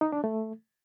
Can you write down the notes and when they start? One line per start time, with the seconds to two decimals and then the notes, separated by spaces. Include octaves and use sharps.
0.01 D#4
0.12 D4
0.24 A3